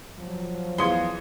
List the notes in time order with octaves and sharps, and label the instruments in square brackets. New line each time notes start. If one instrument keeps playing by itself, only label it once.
[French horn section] F3 F#3
[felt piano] E2 F5 C#7 [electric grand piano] E3 D#6 G#6 [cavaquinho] C6